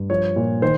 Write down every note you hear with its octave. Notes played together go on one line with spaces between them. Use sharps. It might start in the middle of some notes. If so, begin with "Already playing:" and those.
Already playing: G2
F3 C#5
A#2
D#3 C5